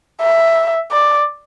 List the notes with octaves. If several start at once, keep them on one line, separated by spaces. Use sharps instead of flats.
E5
D5